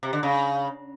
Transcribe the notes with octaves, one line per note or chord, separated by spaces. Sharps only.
C3
D3
C#3